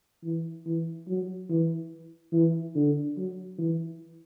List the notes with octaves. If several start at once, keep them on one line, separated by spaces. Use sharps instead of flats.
E3
E3
F#3
E3
E3
D3
F#3
E3